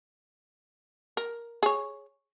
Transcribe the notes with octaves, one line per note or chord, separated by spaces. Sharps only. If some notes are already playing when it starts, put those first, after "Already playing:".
A#4
G#4 C#5